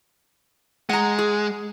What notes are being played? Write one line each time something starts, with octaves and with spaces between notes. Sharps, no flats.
G#3 F#5 A#5
G#4